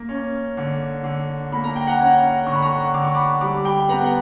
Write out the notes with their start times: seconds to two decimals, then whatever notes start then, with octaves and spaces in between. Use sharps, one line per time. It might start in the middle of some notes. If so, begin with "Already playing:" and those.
Already playing: A#3
0.09 C#4
0.57 D3
1.04 D3
1.52 A#3 B5
1.64 A#5
1.76 G5
1.87 F#5 A#5
1.99 C#4
2.46 D3 C#6
2.55 B5
2.62 A#5 C#6
2.94 D3 D6
3.05 C#6
3.15 B5 D6
3.41 G3 B5 D6
3.65 G5 B5
3.89 B3 F#5 A#5
4.04 F#5